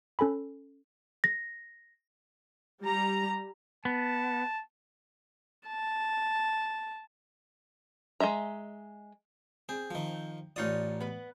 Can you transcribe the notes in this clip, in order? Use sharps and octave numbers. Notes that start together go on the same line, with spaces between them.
C#4 A4 G#5 B5
A#6
G3 A#5
B3 A5
A5
G#3 D#5 E5 A#5
C4 G#4
D#3 F3
A1 D#4 F4 C#5 D5 D#6
B3 B4